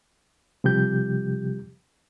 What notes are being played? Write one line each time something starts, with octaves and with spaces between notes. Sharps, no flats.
C3 F3 G3 G4 G6